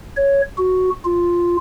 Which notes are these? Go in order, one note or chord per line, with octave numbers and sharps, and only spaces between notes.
C#5
F#4
F4